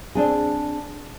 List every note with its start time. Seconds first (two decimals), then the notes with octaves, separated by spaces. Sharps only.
0.15 C4 D4 G#4